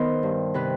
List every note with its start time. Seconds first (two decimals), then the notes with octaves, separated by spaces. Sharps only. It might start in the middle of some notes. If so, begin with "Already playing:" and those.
Already playing: D#3 B3 C5 D#5
0.23 G2
0.54 C3 B4